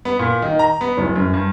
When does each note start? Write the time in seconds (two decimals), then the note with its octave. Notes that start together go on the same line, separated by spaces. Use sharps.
0.05 B3
0.19 A#2
0.42 D#3
0.59 A#5
0.81 B3
0.98 D1
1.16 F#2
1.34 G2